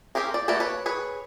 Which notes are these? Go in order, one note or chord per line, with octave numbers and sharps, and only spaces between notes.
C4 C#4 G4 G#4 A#4
D5
A3 A#3 F#4 B4 D5
B4 C#5
G#4 B4 C#5